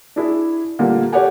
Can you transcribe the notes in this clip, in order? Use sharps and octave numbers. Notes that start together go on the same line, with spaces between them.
D4 E4 G#4
A#2 D3 G3 A#3
G4 A4 C#5 D5 F#5 G#5